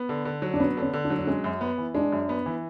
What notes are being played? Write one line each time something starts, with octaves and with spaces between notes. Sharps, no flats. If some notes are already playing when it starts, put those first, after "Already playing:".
Already playing: B3
D3
D3
F#3
D4
B3 C#4
D3 C#4
D3
D4
F#3
D4
G#3 C#4
F#2
B3
E3
G#3 D4
F#2
B3
E3